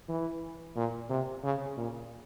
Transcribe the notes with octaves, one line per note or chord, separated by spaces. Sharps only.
E3
A#2
C3
C#3
A#2